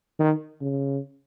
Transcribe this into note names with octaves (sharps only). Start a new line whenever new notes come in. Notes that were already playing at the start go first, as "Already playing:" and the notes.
D#3
C#3